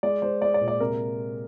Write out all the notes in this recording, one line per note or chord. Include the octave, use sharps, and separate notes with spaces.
G#3 D5
G#3 C5
G#3 D5
D5
A#2
D5
C3 A#4